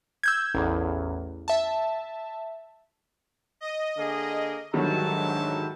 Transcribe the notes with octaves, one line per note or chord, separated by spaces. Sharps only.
E6 G6 G#6
A1 E2
E5 A5
D#5
D3 A#3 G#4
G#2 D3 D#3 F#3 G3 E5 A5